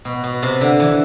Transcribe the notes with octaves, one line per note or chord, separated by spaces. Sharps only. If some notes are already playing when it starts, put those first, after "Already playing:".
B2
B2
C3
D3
E3